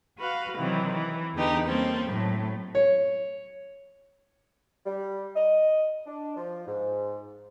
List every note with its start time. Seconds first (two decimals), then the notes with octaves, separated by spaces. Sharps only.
0.18 F#4 B4 F5
0.56 C3 D#3 E3 F#3 C4
0.95 E3
1.35 E2 D3 B3 D#4 G4 B4
1.68 G3 A#3 C4 C#4 A4
2.06 A2 F#3 A3
2.75 C#5
4.86 G3
5.36 D#5
6.07 D4
6.37 F3
6.67 G#2